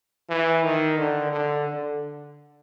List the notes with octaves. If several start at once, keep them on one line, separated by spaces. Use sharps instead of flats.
E3
D#3
D3
D3
D3